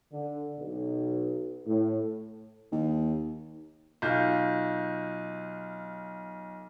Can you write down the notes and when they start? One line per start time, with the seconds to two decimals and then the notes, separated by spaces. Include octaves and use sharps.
0.12 D3
0.59 B1
1.66 A2
2.72 D#2
4.02 B1 F4 G6